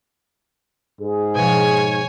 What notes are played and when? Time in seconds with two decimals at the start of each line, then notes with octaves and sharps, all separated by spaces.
1.01 G#2 G#4
1.35 B2 F3 C#5 G#5